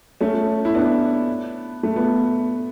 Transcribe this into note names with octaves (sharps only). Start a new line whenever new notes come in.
A3 C#4
E4
B3 D4
A3
B3